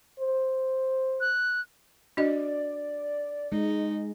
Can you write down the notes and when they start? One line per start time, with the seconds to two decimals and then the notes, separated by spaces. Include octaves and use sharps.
0.20 C5
1.21 F#6
2.17 D4 F#4 D5 D#5
3.52 G#3 D#4